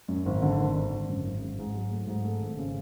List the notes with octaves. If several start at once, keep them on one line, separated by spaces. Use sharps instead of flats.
F#2
G#1
D3
G#1
D3
G#1
F#2
G#1
G#2
G#2
F#3
A3
G#2
A3
G#1
C#3